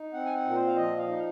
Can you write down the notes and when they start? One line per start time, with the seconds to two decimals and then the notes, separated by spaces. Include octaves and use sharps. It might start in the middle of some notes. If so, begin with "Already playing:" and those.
Already playing: D#4
0.13 C4 F#5
0.25 G#5
0.34 F#5
0.45 A#2
0.51 A#4
0.55 C5
0.67 F5
0.76 F3 D#5
0.97 F5
1.08 D#4